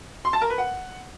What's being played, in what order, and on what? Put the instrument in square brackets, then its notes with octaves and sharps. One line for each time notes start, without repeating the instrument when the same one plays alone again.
[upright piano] C6
A5
A#4
B4
F#5